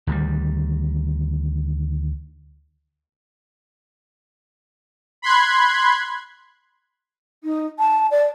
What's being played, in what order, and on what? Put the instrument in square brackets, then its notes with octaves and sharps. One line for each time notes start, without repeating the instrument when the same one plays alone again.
[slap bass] D2 D#3 F#3 G3
[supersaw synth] B5 C6 F#6 G#6
[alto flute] D#4
A5
D5